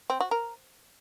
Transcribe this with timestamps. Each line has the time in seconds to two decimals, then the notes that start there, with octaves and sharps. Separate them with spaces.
0.10 C4
0.20 F#4
0.31 A#4